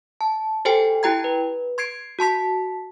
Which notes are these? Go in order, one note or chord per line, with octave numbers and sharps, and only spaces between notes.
A5
G4 A4 C5 G5 G#5
E4 G4 G5 A#5 G#6
B4
C6 G#6 C7 D7
F#4 A5 C6 B6